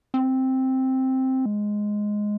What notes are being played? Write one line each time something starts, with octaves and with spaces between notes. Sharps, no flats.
C4
G#3